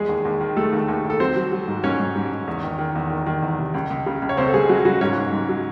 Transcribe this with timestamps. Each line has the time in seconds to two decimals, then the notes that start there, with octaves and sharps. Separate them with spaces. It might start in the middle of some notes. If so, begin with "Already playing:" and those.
Already playing: E2 G#3 G#4
0.09 D#2
0.25 D#2
0.41 D#3
0.57 G#3 A3 A4
0.73 D#2
0.88 D#2
1.04 D#2
1.10 A4
1.20 F#3 C4 C5
1.36 F#3
1.52 F#3
1.68 G#2
1.83 G#2 C#4 C#5
2.00 G#2
2.15 G#2
2.31 G#2
2.48 E2
2.63 D#3
2.79 D#3
2.95 E2
3.10 D#3
3.26 D#3
3.42 E2
3.59 C3
3.74 C#2
3.90 C#2
4.06 C#3
4.22 C#2
4.29 C#5
4.37 C#2 C4 C5
4.46 A4
4.53 C#2 G#3 G#4
4.69 C#2 F#3 F#4
4.85 C#3 F#3 F#4
5.01 G#2 C#4 C#5
5.17 G#2
5.33 G#2
5.49 F#3